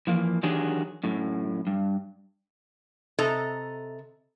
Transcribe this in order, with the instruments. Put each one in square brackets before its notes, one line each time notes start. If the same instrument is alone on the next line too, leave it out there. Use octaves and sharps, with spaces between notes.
[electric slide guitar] E3 F3 A#3
D#3 E3 F#3 D4 G4 G#4
F#2 A2
G2
[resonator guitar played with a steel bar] C3 A4 D#5 A#5